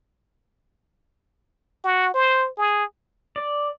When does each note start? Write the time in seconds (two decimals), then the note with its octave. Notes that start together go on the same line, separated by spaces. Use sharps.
1.84 F#4
2.14 C5
2.58 G#4
3.36 D5